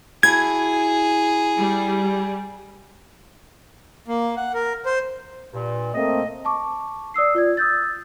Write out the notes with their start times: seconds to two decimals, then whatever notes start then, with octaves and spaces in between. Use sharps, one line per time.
0.23 E4 F#4 G#4 A5 G#6
1.57 G3
4.08 A#3
4.37 F#5
4.54 A#4
4.86 C5
5.54 G2 A#2
5.94 A3 A#3 C4 D#5
6.45 A5 C#6 D6
7.14 D5 D#6 E6 C7
7.35 F4 D5 G#6
7.57 D#6 E6 G6 A6